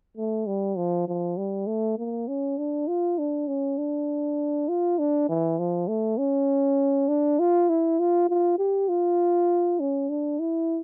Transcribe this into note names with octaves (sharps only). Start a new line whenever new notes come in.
A3
G3
F3
F3
G3
A3
A#3
C#4
D4
F4
D4
C#4
D4
F4
D4
E3
F3
A3
C#4
D4
F4
E4
F4
F4
G4
F4
C#4
D4
E4